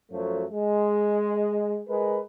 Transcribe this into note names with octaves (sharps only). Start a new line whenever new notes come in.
F#2 F3 F#3 A3
G#3
G#3 A#4 B4